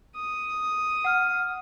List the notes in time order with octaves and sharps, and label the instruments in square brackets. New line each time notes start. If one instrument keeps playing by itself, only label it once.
[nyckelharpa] D#6
[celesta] F#5 F6